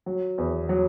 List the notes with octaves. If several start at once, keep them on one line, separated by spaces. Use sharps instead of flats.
F#3
E2
F#3